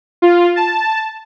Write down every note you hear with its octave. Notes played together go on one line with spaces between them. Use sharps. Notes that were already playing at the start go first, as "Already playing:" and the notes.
F4
A5